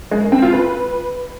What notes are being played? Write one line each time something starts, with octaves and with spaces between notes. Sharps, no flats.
G#3
A#3
C4
F4
B4